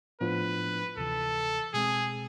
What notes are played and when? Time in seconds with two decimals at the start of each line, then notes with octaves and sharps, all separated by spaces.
0.21 A2 F3 B3 D4 F4 B4
0.97 D2 C3 E3 A4
1.74 B2 G#3 C4 G#4